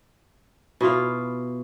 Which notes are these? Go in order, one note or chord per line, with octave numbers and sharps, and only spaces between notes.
B2 E4 F4 F5